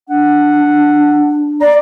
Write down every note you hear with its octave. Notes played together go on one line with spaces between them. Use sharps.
D4 F#5
D5 A#5